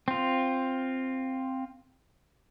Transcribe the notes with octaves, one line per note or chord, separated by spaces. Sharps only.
C4 F4